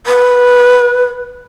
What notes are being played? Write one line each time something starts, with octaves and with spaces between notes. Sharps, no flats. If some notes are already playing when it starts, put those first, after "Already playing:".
B4